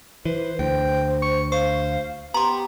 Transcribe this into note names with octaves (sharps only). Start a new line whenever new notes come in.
E3 B4 C5
D2 C5 G5
C#6
C5 F5 C#6
B3 G4 A#5 C6